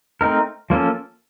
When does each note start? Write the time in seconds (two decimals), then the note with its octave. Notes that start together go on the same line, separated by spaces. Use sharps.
0.21 A3 C4 D#4 A#4
0.70 F3 A#3 C#4 A4